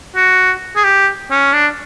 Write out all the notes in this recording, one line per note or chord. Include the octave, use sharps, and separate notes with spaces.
F#4
G#4
G4
C#4
D4